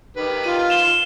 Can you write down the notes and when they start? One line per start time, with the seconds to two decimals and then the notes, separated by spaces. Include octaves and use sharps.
0.17 D#3 G4 B4
0.44 F4 D#7
0.70 F5 E7 G7